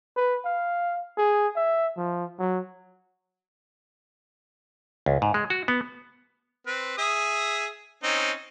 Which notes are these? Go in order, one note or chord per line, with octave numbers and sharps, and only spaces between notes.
B4
F5
G#4
E5
F3
F#3
C#2
G#2
G#3
F#4
B3
C4 B4
G#4 E5 D#6
C4 C#4 D#4